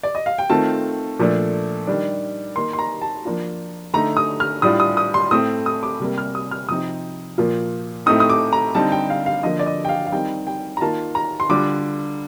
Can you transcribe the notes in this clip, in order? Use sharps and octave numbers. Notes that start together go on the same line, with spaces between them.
D5
D#5
F5
G5
D#3 A3 C4 F4 A5
A#2 F3 A3 D4
D#3 G3 D4
D#3 A#3 D#4 C6
C6
A#5
A5
F3 A#3 D4 F4
D3 A3 D#4 A#5
D#6
F6
A2 G3 D4 F4 D#6
D#6
D#6
C6
A2 A3 C4 D#6
D#6
D6
C3 G3 A#3
F6
D#6
F6
C3 F3 C4 D#4 D#6
A#2 F3 A#3 F4
A2 A3 C4 D#4 D#6
D#6
D6
A#5
D3 G3 C4 D#4 A5
G5
F5
F5
D3 F3 A#3 D#5
D5
D#5
G5
F5
F5
D#3 G3 C4 D#4 G5
G5
A#5
D#3 A#3 F4 A5
A#5
C6
D3 G3 D4 F4 D6